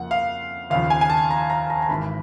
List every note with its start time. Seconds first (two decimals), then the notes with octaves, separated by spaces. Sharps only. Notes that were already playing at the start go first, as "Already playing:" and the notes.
Already playing: F2 C#3 F3 A#3 F#5
0.11 F5
0.70 D#2 C#3 F3 F5
0.90 G#5
1.01 G#5
1.10 A5
1.31 A#5
1.50 A#5
1.70 A#5
1.82 A#5
1.89 G#1 G#2 E3 B5